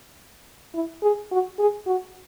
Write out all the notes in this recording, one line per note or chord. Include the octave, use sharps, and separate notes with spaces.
E4
G#4
F#4
G#4
F#4